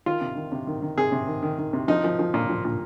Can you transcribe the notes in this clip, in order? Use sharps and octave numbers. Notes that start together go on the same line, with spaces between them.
D#3 F4
C3
D#3
C3
D#3
D#3
C3 G#4
C3
D#3
D#3
D#3
C3
F3 D#4
F3
F3
A#2
F3
A#2